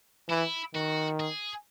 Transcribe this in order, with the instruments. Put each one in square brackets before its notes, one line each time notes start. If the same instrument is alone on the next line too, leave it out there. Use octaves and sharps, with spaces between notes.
[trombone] E3 [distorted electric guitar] E4
[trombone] D#3 [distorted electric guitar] F#4
[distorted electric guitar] G#4